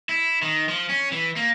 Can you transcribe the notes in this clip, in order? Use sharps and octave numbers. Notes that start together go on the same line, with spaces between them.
E4
D#3
F3
C#4
E3
A#3